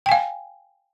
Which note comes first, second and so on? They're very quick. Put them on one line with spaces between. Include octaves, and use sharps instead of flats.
G5 G#5 F5